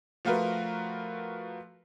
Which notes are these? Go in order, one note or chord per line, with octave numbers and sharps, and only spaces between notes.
F3 A3 F4 F#4 A#4 B4